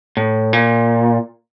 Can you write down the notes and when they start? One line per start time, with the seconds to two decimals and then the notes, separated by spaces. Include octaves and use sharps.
0.17 A2
0.53 A#2